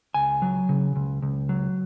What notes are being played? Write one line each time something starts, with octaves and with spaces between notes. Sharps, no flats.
C#2 G#5
F#3
C#3
C#2
C#2
F#3